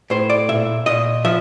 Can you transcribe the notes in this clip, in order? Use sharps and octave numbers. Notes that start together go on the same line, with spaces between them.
A2 C5
D5
A#2 E5
A#2 D#5
F3 E5